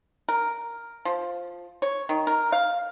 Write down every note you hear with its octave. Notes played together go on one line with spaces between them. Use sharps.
A#4
F3
C#5
D#3
A#4
F5